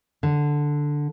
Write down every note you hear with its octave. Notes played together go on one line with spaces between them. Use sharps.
D3